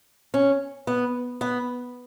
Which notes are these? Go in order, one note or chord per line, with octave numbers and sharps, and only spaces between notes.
C#4
B3
B3